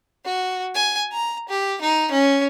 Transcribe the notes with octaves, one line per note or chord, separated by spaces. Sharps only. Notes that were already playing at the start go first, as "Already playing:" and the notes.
F#4
G#5
A#5
G4
D#4
C#4